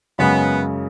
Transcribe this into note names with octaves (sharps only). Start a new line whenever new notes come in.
F#2 C#3 G#3 B3 C#4